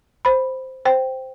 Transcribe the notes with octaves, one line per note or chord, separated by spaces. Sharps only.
C5 B5
C5 G5